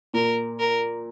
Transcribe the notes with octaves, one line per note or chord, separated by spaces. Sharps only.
A#2 A#4
A#4